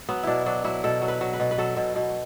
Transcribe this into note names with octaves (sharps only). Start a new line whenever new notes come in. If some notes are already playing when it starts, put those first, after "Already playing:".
F#3 B3
B2 D4 E4
F#3 D4
F#3 E4
B2 A4
F#3
B4
F#3
B4
B2
B4
F#3 A4
B2
B2